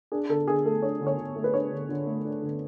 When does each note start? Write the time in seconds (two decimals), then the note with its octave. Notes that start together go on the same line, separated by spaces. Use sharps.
0.12 D4 G#4
0.29 D3 A4
0.48 D3 G#4
0.65 A3 A4
0.82 D4 C#5
1.01 D3
1.07 C#5
1.18 D3
1.36 A3
1.44 B4
1.54 D4 C#5
1.71 D3
1.89 D3
2.07 A3
2.25 D4
2.42 D3